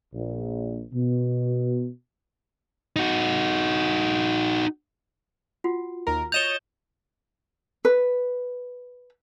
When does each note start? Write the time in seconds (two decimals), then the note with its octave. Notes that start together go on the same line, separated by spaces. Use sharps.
0.13 A#1
0.93 B2
2.96 D#4 F#4
5.64 F4 F#4 F#5
6.07 D#2 A#4 A#5
6.32 C#5 D#5 G6 A6 E7 F7 G7
7.85 B4